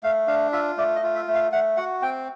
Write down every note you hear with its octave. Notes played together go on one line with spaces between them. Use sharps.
A3 F5
D4 F5
F4 E5
A3 D5
D#5
F4
E5
A3
F5
A3 F#5
F#4 F#5
C4 G5